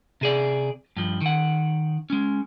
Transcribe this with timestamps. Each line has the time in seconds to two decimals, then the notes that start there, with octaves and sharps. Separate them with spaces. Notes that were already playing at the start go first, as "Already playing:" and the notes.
0.21 C3 G#4 D5
0.97 G2 F3
1.21 D#3 F#5
2.10 G#3 C#4